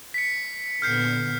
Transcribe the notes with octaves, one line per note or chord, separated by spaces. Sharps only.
B6 C#7
A#2 D3 B3 F6 G6 C7